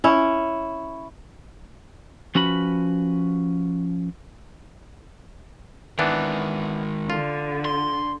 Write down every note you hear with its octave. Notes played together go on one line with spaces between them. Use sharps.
C#4 E4
F3 C#4 F#4 B4 B5
D#3 E3 G#3 B3 D4
D3 F4
C6